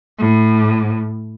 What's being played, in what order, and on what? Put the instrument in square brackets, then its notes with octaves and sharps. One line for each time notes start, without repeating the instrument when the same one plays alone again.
[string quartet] A2